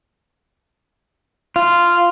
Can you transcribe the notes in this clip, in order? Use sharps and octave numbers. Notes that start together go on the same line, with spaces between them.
F4